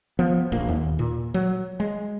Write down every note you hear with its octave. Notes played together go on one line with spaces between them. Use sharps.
F3 B3
D1 A#1 A#3
D#2
A#2
F#3
G#3